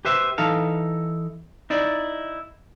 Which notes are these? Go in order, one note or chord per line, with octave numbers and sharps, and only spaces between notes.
G4 B4 C5 E5
E3 D#4 A4 F5
D#4 E4 D5